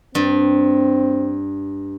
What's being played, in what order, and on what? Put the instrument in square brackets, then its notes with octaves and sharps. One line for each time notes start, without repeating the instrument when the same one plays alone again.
[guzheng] G2 [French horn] C4